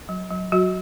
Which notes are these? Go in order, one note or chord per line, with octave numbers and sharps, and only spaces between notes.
F#3
F#3
F#3 F#4